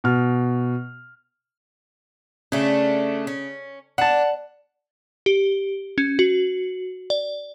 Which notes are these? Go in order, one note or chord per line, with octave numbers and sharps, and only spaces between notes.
B2 F6
C#3 A3 D4
C#4
D4 F#5 A5
G4
C#4
F#4
D5